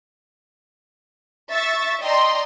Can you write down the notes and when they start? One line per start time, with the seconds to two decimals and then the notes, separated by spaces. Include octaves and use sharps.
1.52 E5 C#6 A6
2.03 D5 D#5 G5 A#5 C6